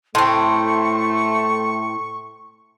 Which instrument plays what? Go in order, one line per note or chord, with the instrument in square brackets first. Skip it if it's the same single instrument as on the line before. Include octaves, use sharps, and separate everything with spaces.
[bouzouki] A2 C4 [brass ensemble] A3 [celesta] C6 [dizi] C#6